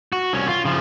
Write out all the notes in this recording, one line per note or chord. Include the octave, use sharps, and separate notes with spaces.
F#4
C2 C#4
F4
C#3 F3